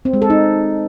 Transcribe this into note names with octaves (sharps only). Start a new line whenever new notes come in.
C4
G#3
A4
D#4